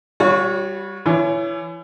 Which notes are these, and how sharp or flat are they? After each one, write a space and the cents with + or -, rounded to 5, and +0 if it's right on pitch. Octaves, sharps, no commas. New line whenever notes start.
G3 +0 F#4 -40 C#5 +0
E3 +30 E4 +25 C#5 +15